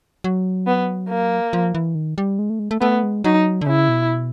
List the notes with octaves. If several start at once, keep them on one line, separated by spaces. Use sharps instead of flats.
F#3
B3
A#3
F3
E3
D#3
G3
G#3
A3
G#3
A3
A3 B3
G#3
F#3 D#4
D3
C#3 E4
B2